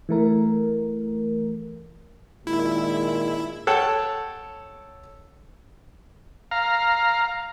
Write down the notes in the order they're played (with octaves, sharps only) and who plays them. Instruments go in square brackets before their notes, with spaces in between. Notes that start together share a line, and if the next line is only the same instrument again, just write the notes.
[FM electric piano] E3 A3 A#4
[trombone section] A#2 D#3 G#3 [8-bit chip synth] E4
[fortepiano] A4 C#5 F#5 G5 A5
[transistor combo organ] F5 A#5